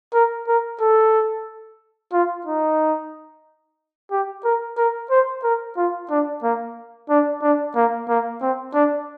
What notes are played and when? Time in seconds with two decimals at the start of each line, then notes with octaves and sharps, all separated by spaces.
0.14 A#4
0.47 A#4
0.80 A4
2.13 F4
2.46 D#4
4.11 G4
4.44 A#4
4.77 A#4
5.10 C5
5.44 A#4
5.77 F4
6.10 D4
6.43 A#3
7.09 D4
7.42 D4
7.75 A#3
8.08 A#3
8.41 C4
8.74 D4